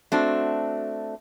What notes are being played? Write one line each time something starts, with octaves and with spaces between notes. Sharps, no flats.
A3 C4 D4 F#4